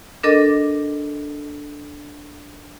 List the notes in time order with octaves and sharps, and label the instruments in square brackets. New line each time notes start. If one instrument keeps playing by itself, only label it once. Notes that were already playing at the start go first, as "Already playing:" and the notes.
[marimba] D4 A4 A#4 D#5 D6